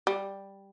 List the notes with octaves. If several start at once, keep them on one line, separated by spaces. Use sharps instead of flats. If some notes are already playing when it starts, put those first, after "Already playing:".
G3